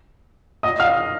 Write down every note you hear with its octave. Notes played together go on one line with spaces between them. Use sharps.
D#5 D#6
F5 F6